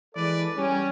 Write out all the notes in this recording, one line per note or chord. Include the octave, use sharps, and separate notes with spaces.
E3 G#3 A4 B4 D5
G3 C#4